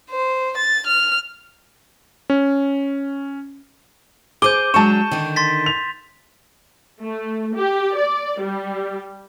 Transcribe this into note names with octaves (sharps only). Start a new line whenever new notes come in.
C5
A6
F6
C#4
G#4 C5 D6 G6 D#7 G7
F#3 G#3 D4 A5 C#6 E7
D3 D#3
C6 A6 B6
F7
A3
G4
D5
G3